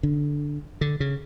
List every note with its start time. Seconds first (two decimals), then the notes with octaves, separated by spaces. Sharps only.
0.03 D3
0.81 D3
1.00 C#3